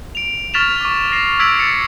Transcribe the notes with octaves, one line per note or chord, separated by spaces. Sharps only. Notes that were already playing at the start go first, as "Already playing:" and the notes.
D7 F7
C#6 F6 A6 B6 E7 F7
C#6 D6
A#6 C7 E7
E6 G#6 B6 D7 F7 F#7
A6 C#7